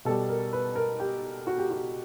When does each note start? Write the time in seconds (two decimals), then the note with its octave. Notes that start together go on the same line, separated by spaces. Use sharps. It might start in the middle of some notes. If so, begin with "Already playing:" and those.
0.05 B2 G3 A4
0.29 A#4
0.53 B4
0.76 A#4
1.00 G4
1.47 F#4
1.58 G4
1.71 F#4